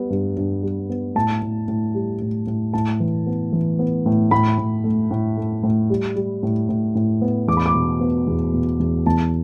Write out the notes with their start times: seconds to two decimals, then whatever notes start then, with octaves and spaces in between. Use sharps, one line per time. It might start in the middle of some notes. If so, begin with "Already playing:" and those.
Already playing: G3 B3
0.10 G2
0.37 G2
0.63 G3
0.89 B3
1.15 A2 A5
1.42 A2
1.68 A2
1.94 G3
2.22 A2
2.47 A2
2.73 A2 A5
3.00 E3
3.27 B3
3.53 E3
3.79 B3
4.06 A2
4.31 A2 B5
4.58 A2
4.84 A3
5.11 A2
5.37 A3
5.63 A2
5.90 G3
6.16 G3
6.43 A2
6.69 A2
6.95 A2
7.22 B3
7.48 E2 D6
7.57 B5
7.66 D6
7.74 B2
8.01 B3
8.27 E2
8.54 B2
8.80 E2
9.06 E2 A5